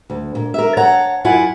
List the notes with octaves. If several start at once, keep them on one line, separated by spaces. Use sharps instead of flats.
D2
A#2
A#4 E5
C#5 F#5 A5 A#5
F#2 E4 F4 F#5 G#5